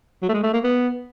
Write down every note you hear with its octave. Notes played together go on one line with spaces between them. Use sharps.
F#3
A3
G#3
A3
A#3
B3